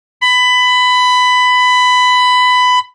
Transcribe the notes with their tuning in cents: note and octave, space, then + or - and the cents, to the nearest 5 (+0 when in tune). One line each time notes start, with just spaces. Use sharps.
B5 +15